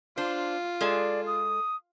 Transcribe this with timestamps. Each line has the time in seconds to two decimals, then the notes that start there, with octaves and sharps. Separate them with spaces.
0.17 D4 F4 C5
0.81 G#3 G#4 A4 D5
1.26 D#6